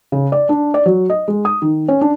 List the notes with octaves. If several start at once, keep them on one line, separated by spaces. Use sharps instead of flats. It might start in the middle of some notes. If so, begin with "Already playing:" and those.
C#3
D5
D4
D5
F#3
D#5
G#3
D#6
D#3
C#4
D4